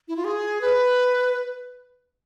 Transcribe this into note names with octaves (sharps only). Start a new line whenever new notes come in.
E4
F4
G#4
B4